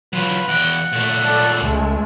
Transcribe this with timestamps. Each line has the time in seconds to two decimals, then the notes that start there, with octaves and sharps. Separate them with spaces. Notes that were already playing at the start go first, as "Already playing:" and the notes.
0.13 F#3 F4 B4
0.48 E2 F#5 G5
0.92 A#2 A3
1.23 A4 D5
1.62 C#2 G#3 A3